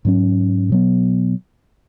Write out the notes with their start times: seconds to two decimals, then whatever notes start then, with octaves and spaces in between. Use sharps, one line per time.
0.05 G#2 F#3 C#4
0.69 B2 F#3 B3